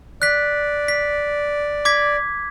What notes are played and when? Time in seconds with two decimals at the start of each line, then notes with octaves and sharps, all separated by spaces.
0.22 D5 F#6 B6
0.88 B6
1.85 D6 G#6 B6